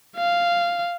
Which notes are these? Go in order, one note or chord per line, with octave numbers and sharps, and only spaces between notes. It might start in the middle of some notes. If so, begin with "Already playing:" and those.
F5